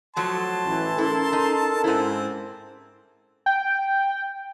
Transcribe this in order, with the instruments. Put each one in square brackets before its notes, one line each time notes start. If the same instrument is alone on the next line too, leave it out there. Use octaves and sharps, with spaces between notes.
[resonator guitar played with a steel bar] F3 F#3 A3 [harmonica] A5 C6
[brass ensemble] A1 E3
[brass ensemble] C#4 A4 A#4 [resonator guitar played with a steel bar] E4
[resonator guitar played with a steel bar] D#4
[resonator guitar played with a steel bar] G#2 E4 [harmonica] C4
[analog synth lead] G5